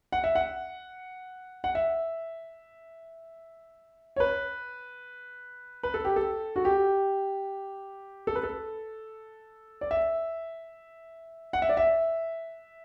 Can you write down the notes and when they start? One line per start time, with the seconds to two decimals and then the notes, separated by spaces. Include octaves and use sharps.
0.12 F#5
0.24 E5
0.35 F#5
1.64 F#5
1.75 E5
4.16 C#5
4.20 B4
5.83 B4
5.94 A4
6.05 G4
6.16 A4
6.56 F#4
6.65 G4
8.27 A4
8.35 B4
8.43 A4
9.81 D5
9.91 E5
11.53 F#5
11.62 E5
11.69 D5
11.77 E5